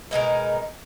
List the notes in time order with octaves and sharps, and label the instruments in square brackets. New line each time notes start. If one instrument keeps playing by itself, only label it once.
[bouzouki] B2 G#3 D#4 A#4